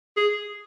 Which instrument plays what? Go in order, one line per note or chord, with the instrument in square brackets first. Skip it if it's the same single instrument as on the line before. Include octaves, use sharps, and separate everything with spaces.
[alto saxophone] G#4